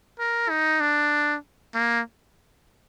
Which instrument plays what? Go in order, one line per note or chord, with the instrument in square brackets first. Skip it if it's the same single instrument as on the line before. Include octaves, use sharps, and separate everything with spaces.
[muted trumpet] A#4
D#4
D4
A#3